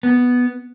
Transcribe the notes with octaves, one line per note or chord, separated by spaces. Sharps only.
B3